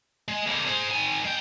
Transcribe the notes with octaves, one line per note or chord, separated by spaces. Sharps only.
G#3
E2 D3
G#4 C5
D#3 G#5
G#3 G5